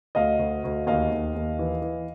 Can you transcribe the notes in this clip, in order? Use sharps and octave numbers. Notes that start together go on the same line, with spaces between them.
D2 D#5 F5
D2
D2
D#2 D#5 F5
D#2
D#2
E3
E3